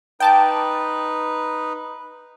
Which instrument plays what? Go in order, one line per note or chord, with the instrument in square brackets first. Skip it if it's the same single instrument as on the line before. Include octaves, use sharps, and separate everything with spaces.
[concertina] D#4 B4 [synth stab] G5 A5 D6